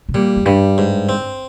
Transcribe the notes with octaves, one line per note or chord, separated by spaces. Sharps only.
C3
A#2 G3
F2
G2 G3
G#2
C4